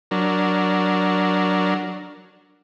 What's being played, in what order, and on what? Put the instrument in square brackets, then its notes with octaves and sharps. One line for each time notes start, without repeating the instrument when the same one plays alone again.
[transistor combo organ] F#3 D4 A#4